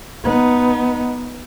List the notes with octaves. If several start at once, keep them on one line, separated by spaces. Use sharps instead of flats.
B3 D#4